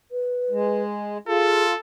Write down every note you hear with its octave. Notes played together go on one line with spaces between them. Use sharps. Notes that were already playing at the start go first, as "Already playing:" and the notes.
B4
G#3
F4 G#4 A4